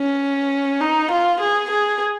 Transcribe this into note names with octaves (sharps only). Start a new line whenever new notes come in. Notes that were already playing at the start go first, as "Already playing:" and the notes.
Already playing: C#4
D#4
F4
G#4
G#4